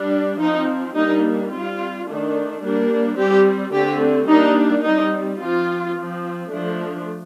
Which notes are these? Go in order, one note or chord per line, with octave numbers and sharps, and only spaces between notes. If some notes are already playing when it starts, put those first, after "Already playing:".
Already playing: G3 D4
F3 C4 D#4
G3 A#3 D4 D#4
G3 C4 F4
D#3 A3 D4
G3 A#3 D4
G3 C4 G4
D3 A3 C4 G4
G3 A#3 D4 D#4
G3 C4 D#4
F3 C4 F4
F3 C4
F3 A3 D4